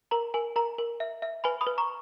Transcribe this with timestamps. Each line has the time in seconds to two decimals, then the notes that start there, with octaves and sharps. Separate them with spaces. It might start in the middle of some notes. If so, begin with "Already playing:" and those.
0.11 A#4 A#5
0.34 A#4 G#5
0.56 A#4 A#5
0.78 A#4
1.00 E5
1.22 E5
1.44 B4 G#5 B5
1.61 B5 D#6
1.66 B4
1.78 A#5 C#6